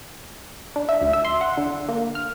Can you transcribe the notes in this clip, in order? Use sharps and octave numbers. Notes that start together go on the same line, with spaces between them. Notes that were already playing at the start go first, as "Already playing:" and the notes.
D4
E5
D2
E5
C6
F#5
D3
A#3
F6